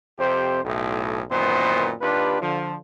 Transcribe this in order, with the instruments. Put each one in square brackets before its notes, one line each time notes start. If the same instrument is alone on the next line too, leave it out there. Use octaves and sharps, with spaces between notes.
[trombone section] F2 C3 G4 C5
B1 A2
F#2 A#2 D#3 E3 B3 C5
D#2 D4 F4 G4 B4
D3 F3